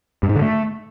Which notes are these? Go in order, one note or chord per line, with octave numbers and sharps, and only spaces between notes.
G2
G#2
D3
A3